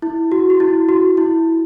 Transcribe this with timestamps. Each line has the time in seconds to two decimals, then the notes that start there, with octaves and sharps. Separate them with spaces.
0.02 E4
0.32 F#4
0.50 F#4
0.60 E4
0.89 F#4
1.17 E4